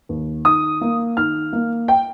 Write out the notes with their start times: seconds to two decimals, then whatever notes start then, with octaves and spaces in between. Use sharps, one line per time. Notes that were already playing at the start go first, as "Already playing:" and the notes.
0.09 D#2
0.45 D#3 D#6
0.81 A#3
1.17 D#3 F6
1.53 A#3
1.88 G5